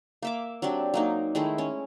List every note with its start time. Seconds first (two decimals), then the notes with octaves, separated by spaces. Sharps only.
0.22 A#3 E5 D6
0.62 F#3 C4 D4 G4
0.94 F#3 A#3 D#4
1.35 D#3 G#3 A3 E4
1.58 C#4